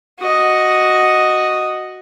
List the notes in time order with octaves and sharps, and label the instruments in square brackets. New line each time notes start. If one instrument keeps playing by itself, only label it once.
[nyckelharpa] F#4 D#5